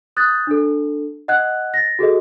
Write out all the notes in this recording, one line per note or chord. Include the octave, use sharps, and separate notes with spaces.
D#6 F#6 G6 A6
D4 A4
D#5 F#5 F#6 G#6
A6 A#6
F#4 G#4 A4 D#5